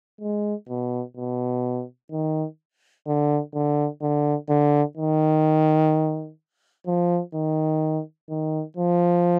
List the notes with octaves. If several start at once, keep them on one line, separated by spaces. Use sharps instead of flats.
G#3
B2
B2
D#3
D3
D3
D3
D3
D#3
F3
D#3
D#3
F3